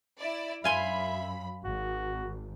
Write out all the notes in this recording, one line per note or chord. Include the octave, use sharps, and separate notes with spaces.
E4 D5
F#2 E5 F5 G#5 B5 C6
G#1 F#4